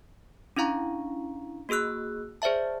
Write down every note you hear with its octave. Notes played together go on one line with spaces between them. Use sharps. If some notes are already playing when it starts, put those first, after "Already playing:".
C#4 D4 E4 F5 A#5 C#6
A#3 F#4 G#4 E6 F#6
G#4 C5 D5 E5 A5